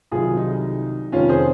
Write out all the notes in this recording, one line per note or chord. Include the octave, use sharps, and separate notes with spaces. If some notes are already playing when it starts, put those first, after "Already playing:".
C2 C3 D#3 F#3 F4 G#4
D#4
F1 F2 D#3 C#4 F4
G#4 C5